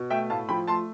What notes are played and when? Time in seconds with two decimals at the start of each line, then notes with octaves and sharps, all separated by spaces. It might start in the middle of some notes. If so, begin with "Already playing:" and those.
Already playing: B2
0.10 A3 E5 G5
0.30 A2 F5 A5
0.49 F3 G5 B5
0.67 A3 A5 C6